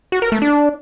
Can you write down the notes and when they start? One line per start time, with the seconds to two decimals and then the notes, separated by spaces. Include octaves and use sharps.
0.12 F#4
0.22 A#4
0.32 A3
0.42 D4